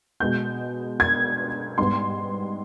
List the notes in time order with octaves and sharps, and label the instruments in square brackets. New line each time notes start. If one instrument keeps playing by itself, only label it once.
[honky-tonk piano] B2 G#3 B3 G6
G#6
G#2 G3 B3 C6